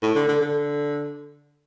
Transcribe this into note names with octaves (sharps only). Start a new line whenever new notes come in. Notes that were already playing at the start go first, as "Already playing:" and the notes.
A2
D3
D3
D3